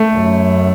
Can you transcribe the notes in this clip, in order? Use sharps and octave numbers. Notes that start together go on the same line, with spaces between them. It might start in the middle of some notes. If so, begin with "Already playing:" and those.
Already playing: A3
F#2